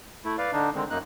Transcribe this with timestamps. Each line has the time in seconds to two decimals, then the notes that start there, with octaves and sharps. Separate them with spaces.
0.25 A3 E4
0.38 B4 D5 F5
0.53 D3 D4 D#4
0.75 D3 D#3 G#3 C4
0.90 F#2 A#3 D#4 F#6